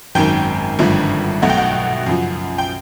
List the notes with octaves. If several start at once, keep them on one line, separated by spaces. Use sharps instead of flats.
G#1 F#2 D#3 G5
G#1 G2 D3 F3 A3
B1 B2 F#3 A3 F#5
G5
F#5
F#2 C#3 F3
G5